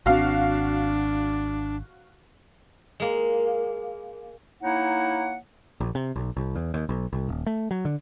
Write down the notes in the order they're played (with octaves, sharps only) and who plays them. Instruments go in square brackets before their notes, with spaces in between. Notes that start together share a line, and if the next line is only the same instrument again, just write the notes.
[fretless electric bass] G#1 C4 [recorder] D4 [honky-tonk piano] F#4 F5
[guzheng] G#3 A#3
[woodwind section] A#3 D#4 E4 C#5 F#5
[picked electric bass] A#1
C3
B1
C2
E2
D#2
B1
C2
D#1
A3
F#3
D3